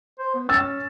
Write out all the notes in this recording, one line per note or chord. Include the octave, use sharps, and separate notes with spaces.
C5
B3
C#4 E6 A6